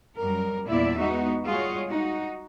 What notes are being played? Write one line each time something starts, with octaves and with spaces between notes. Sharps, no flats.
F#2 G3 A#4
E2 A#2 G3 E4 D5 E5
G#3 B3 D#4 F#4
G3 G#3 F4 F#4 G#4 C#5
D#4 F#4